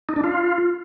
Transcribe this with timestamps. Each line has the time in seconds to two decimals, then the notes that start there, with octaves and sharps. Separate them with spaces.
0.09 D#4
0.16 D4
0.24 F4